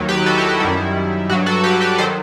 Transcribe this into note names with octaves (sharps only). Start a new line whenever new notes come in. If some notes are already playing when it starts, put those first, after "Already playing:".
Already playing: D#2 D#3 F#3
G4 B4
F#4 A4
E4 G4
F#4
F#2 D#3 G3 E4
G2 F#3 F#4
F#4 A4
G4 B4
G4 B4
D#3 F#3 A4 C5